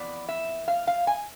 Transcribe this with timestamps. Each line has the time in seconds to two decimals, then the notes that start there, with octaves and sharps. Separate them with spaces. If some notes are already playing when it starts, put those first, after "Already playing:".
Already playing: F2 E3 B3 D5
0.28 E5
0.68 F5
0.87 F5
1.07 G#5